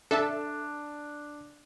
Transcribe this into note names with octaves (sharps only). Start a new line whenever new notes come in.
D4 A4 E5 A5